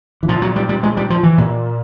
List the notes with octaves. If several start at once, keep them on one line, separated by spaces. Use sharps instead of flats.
E3
A#2 F3
F#3
G3
G3
G#3
G3
F3
E3
A#2